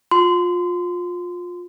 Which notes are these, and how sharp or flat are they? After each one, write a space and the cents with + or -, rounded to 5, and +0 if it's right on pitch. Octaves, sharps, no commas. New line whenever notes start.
F4 +25 C6 -25